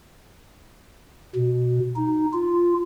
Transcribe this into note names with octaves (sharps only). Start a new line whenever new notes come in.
B2
D#4
F4